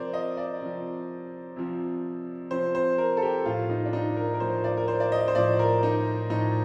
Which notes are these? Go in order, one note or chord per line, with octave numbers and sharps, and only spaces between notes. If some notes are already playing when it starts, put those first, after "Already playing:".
Already playing: C3 F3 A#4 C5 D5
D#5
D5
C3 F3
C3 F3
C3 F3 C5
C5
A#4
A4
G4
A2 F3 F4
D#4
D4
D#4
A#4
A#4
A2 F3 C5
D5
A#4
C5
D5
D#5
C5
A2 F3 D5
A#4
D#4
A2 F3 D#4